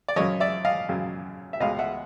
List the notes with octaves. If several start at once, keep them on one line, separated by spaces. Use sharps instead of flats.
D5
F#2 C#3 F#3 C#5 D#5
D5 E5
D#5 F5
F#2 C#3 F#3
E5
C#2 B2 G#3 D#5 F5
E5 F#5